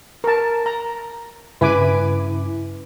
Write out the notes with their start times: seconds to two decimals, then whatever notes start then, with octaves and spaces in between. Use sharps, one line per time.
0.24 A#4 A5
0.66 A#5
1.61 G2 C#3 E4 B4 G#5 D6